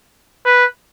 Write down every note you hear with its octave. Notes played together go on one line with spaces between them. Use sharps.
B4